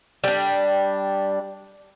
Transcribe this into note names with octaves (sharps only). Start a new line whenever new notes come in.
G3 D4